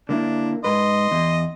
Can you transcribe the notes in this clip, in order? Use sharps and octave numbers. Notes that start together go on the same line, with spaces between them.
D3 A#3 D4 E4
G#2 B4 D#5 C6
E2